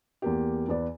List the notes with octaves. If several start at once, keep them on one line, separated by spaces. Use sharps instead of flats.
E2 A#3 G4
E2 B4 D5